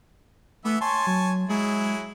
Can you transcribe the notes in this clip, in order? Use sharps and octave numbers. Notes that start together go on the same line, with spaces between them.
E3 A3 B3 E5
C#5 G#5 A5 C6
F#3
F#3 G#3 E4 G#4